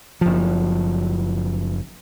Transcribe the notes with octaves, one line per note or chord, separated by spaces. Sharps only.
F#1 F3